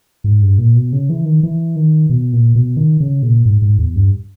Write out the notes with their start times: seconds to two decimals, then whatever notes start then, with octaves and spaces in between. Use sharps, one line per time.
0.24 G#2
0.42 G2
0.58 A#2
0.75 B2
0.93 C#3
1.09 E3
1.25 D#3
1.43 E3
1.76 D#3
2.10 B2
2.33 A#2
2.56 B2
2.77 D#3
3.00 C#3
3.22 A#2
3.45 G#2
3.62 G#2
3.78 E2
3.96 G2